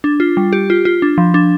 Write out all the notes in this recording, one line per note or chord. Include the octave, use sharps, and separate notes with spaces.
D4
F4
G3
G4
F4
F4
D4
F3
D4